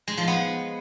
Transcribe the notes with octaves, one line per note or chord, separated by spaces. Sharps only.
G#3
F3
B3